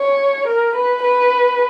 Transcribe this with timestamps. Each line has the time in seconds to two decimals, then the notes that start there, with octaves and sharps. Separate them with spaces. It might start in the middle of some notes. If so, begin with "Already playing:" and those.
Already playing: C#5
0.47 A#4
0.75 B4
1.03 B4